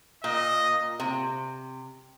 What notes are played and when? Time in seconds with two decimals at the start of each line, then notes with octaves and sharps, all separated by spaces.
0.24 A#2 D#5
1.00 C3